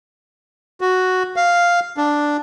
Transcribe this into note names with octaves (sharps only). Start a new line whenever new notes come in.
F#4
F5
D4